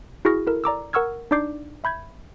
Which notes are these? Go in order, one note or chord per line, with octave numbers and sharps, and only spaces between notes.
E4 F#4 G#4 C#6 F6 A#6
E4 A4 A#4
D5 A#5 D6 E6
A#4 F#5 C#6 E6 F6 G#6
D4 D#4 D5 D6 G6 C7
E5 B5 G6 G#6